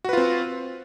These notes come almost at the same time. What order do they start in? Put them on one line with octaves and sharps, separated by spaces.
F#4 B4 F4 C4